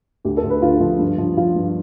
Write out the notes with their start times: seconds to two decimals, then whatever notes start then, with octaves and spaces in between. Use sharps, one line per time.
0.25 D2 G4
0.37 A4
0.43 D2
0.50 B4
0.62 D3 F4
0.80 F3
0.99 G2
1.18 F3
1.37 F3 F4
1.56 G2